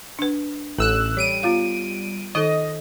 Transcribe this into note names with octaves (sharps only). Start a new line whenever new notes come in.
D4 B4
A1 A4 E6 F#6
G3 C#5 D7 D#7
B3 F4 F5
D#3 D#4 A4 D#5